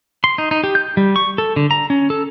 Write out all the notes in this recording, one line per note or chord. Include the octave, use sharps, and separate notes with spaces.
C6
D#4
D#4
G4
G6
G3
C#6
A4
D3
A#5
C#4
A4